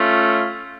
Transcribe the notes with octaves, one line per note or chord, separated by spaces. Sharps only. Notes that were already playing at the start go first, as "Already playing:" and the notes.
Already playing: A3 C#4 F4